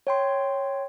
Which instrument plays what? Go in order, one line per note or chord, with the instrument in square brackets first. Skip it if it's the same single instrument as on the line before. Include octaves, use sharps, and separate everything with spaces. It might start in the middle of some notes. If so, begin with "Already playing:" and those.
[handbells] C#5 G5 C6